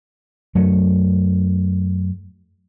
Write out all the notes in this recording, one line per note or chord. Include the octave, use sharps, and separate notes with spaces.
F#2 F#3 A3